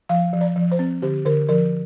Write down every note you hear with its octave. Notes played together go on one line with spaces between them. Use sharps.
F3 F5
F3
D5
F3
C5
C4
D3 G4
D3 A#4
F3 A#4